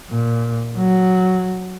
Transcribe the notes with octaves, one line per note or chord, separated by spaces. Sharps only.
A#2
F#3